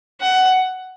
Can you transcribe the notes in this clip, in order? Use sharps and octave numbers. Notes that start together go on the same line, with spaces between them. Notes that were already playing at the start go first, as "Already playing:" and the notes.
F#5